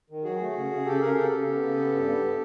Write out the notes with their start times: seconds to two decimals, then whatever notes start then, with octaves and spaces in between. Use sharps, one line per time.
0.10 D#3
0.24 F#3 F#4 G#4
0.40 A3
0.55 C#3
0.71 C#3
0.85 C#3 G4 A4
1.00 C#3 G#4 A#4
1.16 C#3 G4 A4
1.31 C#3
1.46 B3
1.62 C#3
1.76 B3
1.92 G2
2.08 B3